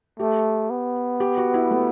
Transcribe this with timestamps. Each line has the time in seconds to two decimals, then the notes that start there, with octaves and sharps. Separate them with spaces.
0.19 A3 G4
0.70 B3
1.20 G4
1.37 F#4
1.54 E4
1.71 A3